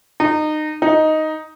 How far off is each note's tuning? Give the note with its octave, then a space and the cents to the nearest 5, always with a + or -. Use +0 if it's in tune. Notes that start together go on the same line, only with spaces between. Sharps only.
D#4 -25
D#4 +5